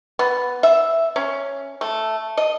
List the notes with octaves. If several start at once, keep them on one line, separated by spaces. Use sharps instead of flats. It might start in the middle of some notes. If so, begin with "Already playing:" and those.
B3
E5
C#4
A3
D#5